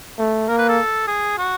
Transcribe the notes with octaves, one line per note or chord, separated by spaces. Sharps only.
A3
A#3 A#4
B4
A4
G#4
F#4